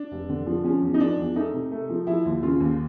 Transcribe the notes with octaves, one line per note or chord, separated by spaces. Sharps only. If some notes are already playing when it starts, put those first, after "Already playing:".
Already playing: D4
F1
D3
F3
F3 C#4
E2
D#4
F3 D4
E2
A3 D#4
C3
A3
F3
F3 E4
D#2
C#3 F4
D#2